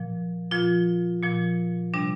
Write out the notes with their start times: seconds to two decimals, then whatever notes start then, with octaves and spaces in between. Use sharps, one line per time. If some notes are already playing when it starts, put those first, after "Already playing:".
Already playing: A#2 F3
0.51 A#2 F3 F4
1.23 A#2 F3
1.94 C3 G3 D4